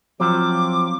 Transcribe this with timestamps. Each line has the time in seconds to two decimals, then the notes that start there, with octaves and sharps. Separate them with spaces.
0.20 F3 F#3 C4 D6